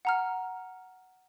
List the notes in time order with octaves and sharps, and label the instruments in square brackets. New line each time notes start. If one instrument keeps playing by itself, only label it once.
[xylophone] F#5 A#5 F6